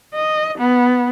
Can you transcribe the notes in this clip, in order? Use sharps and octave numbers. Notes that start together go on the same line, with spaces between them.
D#5
B3